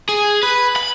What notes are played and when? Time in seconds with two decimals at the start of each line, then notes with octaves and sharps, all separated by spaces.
0.09 G#4
0.43 B4
0.76 B5